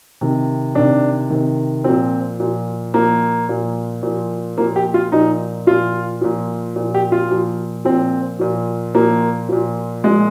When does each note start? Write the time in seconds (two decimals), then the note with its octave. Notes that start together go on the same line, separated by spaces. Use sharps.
0.21 C3 D#3
0.75 C3 D#3 D4
1.30 C3 D#3
1.84 A#2 F3 C4
2.40 A#2 F3
2.94 A#2 F3 A#3
3.49 A#2 F3
4.03 A#2 F3
4.58 A#2 F3 A#3
4.76 G4
4.94 F4
5.12 A#2 F3 D#4
5.67 A#2 F3 F4
6.21 A#2 F3
6.76 A#2 F3
6.94 G4
7.12 F4
7.30 A#2 F3
7.85 A#2 F3 C4
8.39 A#2 F3
8.95 A#2 F3 A#3
9.49 A#2 F3
10.04 A#2 F3 G#3